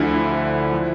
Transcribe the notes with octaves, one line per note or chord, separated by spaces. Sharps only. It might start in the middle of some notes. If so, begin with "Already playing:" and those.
Already playing: D2 D3 F3 E4
F3